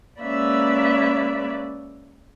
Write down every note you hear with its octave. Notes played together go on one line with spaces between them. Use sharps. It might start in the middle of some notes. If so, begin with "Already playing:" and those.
G#3 A#3 C#4 B4 D5 E5